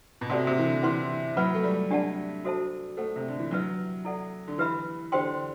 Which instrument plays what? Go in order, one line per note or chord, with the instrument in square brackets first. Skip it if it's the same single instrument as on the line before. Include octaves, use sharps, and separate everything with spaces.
[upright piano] B2
[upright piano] C3 [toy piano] F#4 A4 D5 F#5 C6
[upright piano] C3
E3
D3
[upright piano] E3 [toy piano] B4 F#5 C6
[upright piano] F#3 [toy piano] B4 F#5 B5
[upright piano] A3
G3
[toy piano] D4 G4 D5 F#5 A5
F#4 A4 C5 E5 A5
[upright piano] A3 [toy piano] A4 C5 F#5
[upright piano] C3
D3
E3
[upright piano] F#3 [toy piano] D4 G4 B4 E5
[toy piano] E4 A4 D5 F#5
[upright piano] D3
[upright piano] E3 [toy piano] G4 B4 E5 B5
[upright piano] D3 [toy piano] G4 C5 G5 C6